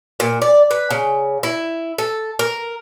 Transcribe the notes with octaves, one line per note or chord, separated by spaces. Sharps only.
A#2
D5
B4
C#3
E4
A4
A#4